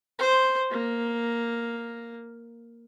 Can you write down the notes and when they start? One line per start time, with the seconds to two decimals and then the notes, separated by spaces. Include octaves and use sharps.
0.19 C5
0.71 A#3